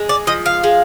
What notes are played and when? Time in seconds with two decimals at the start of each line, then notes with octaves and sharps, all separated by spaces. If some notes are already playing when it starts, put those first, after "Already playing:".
Already playing: G#3
0.09 D5
0.27 F3 D#5
0.46 F5
0.64 G#3